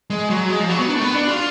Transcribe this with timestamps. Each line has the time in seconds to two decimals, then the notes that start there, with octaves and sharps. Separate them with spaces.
0.10 G#3
0.30 F#3
0.49 G#3
0.59 F3
0.68 F#3
0.78 B3
0.88 D4
0.95 A3
1.01 B3
1.14 D4
1.28 F4